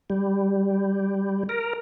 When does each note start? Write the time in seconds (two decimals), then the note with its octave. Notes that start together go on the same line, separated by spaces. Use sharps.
0.10 G3
1.49 A#4